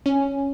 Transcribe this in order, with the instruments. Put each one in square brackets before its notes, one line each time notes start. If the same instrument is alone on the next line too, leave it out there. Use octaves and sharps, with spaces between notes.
[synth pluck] C#4